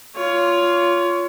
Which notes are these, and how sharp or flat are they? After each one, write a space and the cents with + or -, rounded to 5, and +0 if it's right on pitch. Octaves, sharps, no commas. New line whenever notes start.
F4 +0 C#5 +25